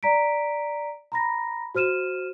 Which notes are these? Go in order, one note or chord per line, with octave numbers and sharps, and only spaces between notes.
D5 A#5 B6 D7
A#5 B5 A#6
F#4 C5 F6 D#7 E7